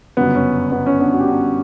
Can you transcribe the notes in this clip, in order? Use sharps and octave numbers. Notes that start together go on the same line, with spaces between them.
G1 F#2 C#3 F#3 B3
C#4
B3
C#4
B3 D4
F#4
G4
D4 F#4